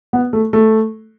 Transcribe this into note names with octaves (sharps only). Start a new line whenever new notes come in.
B3
A3
A3